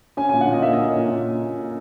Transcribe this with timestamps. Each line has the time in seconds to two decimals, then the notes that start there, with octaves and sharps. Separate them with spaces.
0.17 C#4 G#5
0.29 G#5
0.33 A#2
0.41 F#5
0.48 A#2
0.53 D#5
0.62 A#3 E5
0.73 D#5
0.80 C#4
0.96 A#2
1.11 A#2